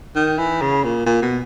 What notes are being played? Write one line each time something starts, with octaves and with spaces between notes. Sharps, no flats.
D#3
E3
C#3
A#2
A#2
B2